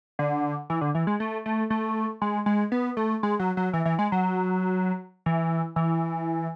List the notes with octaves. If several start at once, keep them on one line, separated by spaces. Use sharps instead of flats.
D3
E3
D3
E3
G#3
A3
A3
A3
G#3
G#3
B3
A3
G#3
F#3
F#3
E3
E3
G#3
F#3
E3
E3